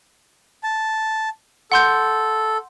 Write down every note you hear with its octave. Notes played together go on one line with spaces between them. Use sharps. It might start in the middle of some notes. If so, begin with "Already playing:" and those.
A5
A4 F#5 C6 G6